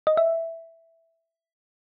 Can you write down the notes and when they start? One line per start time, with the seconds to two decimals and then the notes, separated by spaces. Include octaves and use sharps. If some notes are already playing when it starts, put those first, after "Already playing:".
0.07 D#5
0.17 E5